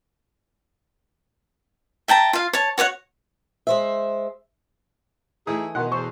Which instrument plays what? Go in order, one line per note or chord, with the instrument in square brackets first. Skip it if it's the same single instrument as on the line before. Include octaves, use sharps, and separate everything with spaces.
[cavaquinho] E5 G5 A5 A#5
F4 F5
C#5 A5
F#4 C#5 D5 F#5
[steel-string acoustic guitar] G#3 C5 E5
[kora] E3 A3 [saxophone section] D#4 E4 G#4 [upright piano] D#6
[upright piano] B2 C6 [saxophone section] D#3 [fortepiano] F#5
[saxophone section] E2 C5 [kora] A4 [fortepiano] C#6